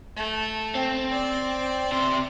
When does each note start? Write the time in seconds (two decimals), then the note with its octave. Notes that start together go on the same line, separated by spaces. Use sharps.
0.16 A3
0.75 C4
1.12 D5
1.92 C3 C5